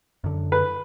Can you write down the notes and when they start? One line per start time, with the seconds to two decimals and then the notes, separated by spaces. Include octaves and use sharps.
0.24 F#2 D3
0.52 B4